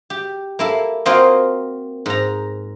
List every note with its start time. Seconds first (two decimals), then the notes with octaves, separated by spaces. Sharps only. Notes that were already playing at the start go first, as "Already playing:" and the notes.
0.10 G4
0.59 A#3 E4 A4
1.06 A#3 C4 F4 F#4 C5 D#5
2.06 G#2 A#5